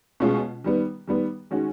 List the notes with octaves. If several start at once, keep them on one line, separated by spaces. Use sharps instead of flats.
B2 G#3 C#4 F4
D#3 G3 B3
D#3 G3 B3
D#3 G#3 C#4 F#4